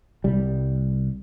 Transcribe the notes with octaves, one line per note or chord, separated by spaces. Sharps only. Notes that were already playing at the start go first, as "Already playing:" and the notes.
C2 G3